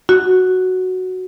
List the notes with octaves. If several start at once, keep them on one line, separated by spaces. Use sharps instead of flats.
F#4